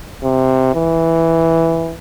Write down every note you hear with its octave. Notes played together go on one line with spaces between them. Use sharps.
C3
E3